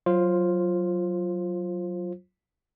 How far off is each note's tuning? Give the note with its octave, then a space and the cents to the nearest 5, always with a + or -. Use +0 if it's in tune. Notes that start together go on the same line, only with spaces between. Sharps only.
F#3 +0 F4 +0 C5 +20